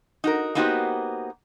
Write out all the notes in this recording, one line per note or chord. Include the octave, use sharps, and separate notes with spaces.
D#4 F#4 A#4
A#3 B3 D#4 F#4 G4 C5